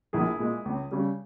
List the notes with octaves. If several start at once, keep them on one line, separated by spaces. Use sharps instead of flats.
A#1 E4 G#4
A#2 G#3
C#2
C#3 G3